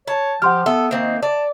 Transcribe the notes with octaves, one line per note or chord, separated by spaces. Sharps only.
C#5 A5
F3 G4 F#5 C6 F6
B3 A4 E5
D#3 A#3 C4
D5 A5